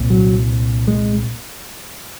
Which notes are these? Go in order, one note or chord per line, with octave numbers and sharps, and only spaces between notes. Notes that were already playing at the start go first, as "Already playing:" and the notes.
Already playing: C2 A#2
F#3
G#3